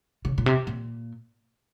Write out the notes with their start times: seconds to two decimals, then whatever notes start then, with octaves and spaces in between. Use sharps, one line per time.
0.25 C#3
0.38 A#2
0.46 C3
0.67 A#2